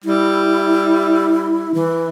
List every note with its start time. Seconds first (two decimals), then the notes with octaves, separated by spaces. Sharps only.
0.04 G3 E4
1.74 E3